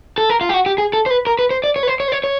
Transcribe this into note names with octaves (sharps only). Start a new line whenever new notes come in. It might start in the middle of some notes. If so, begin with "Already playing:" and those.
A4
A#4
F4
G4
F#4
G4
G#4
A4
C5
B4
A#4
B4
C5
D5
C#5
B4
C5
C#5
C5
C#5
C#5